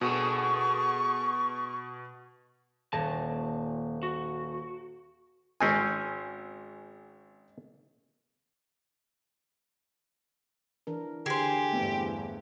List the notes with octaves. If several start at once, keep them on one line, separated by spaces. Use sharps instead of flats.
B2 F#4 G#4 A4 C#6
D#1 A#2 A5
F#4
G#1 G#3 C4 C#4 G#5
E3 D4 A#4
D3 G4 G#4 C5
E2 G2 A3 B3 C4